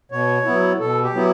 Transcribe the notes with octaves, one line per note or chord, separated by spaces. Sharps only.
B2 C#5
F#3 B3 E4
B2 A4
G4
F#3 B3 E4